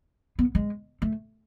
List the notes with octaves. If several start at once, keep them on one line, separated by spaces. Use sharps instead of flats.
B3
G#3
A3